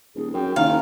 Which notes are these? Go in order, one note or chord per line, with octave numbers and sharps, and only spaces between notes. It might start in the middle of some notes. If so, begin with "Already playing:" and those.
D#1 G#4
F#2 G5
F#1 D#3 F5 A#5